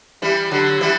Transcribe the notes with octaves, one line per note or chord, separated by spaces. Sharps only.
E3 G3
D3 F#3
E3 G3